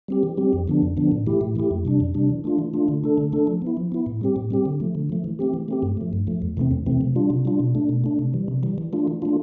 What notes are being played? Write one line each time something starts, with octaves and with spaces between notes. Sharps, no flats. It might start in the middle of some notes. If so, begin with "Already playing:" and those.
G3 C4 G4
E3
G3 C4 G4
F2
D3 F3 B3 D4
F2
D3 F3 B3 D4
A2
E3 A3 E4 G4
A2
E3 A3 E4 G4
F2
C3 G3 D4
F2
C3 G3 D4
E3
A3 D4 F4
E3
A3 D4 F4
D3
A3 D4 A4
D3
A3 D4 A4
F3
B3 E4
F3
B3 E4
A2
G3 C4 G4
A2
G3 C4 G4
D3
F3 A3
D3
F3 A3
E3
A3 C4 G4
E3
A3 C4 G4
G2
F3 A3
G2
F3 A3
E2
C3 E3 A3 C4
E2
C3 E3 A3 C4
C3
G3 D4 F4
C3
G3 D4 F4
B2
A3 D4
B2
A3 D4
C3
E3 G3
C3
E3 G3
E3
A3 D4 F4
E3
A3 D4 F4